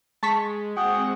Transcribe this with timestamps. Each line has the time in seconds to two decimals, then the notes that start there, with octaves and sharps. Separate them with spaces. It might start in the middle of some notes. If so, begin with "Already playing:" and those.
0.23 G#3 A5 C#6 B6
0.76 G#3 C4 F#4 G#4 F#5 G5